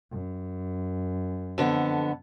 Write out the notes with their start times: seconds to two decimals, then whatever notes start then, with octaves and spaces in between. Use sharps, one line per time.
0.11 F#2
1.58 F2 D3 B3